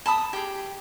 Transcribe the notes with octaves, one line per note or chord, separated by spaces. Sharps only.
A5 B5 D#6
G4 G#4